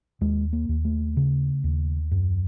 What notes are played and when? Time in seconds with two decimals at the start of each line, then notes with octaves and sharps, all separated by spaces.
0.21 D#2 G#3
0.53 A#3
0.69 D#2
0.85 A3
1.17 C#3
1.64 D#2
2.11 F#2